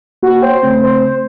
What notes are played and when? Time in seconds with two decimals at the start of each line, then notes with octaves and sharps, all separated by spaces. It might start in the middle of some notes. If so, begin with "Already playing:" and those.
0.23 A#3 F#4
0.42 C5 C#5 G5
0.63 C#3 A3 C4
0.82 C5